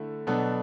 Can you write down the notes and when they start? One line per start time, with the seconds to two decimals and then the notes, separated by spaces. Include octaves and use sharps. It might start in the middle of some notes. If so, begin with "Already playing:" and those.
Already playing: D3 A3 E4
0.27 B2 F#3 B3 D4 A4